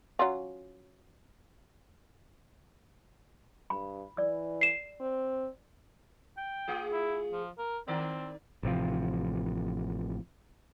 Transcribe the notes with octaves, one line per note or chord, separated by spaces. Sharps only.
F#3 C#4 F4
G2 B5
E3 D5 E6
C7 E7
C4
G5
A3 F4 G#4
E4
F3
A#4
D#3 C4 A#4 D5
A1 C3 F3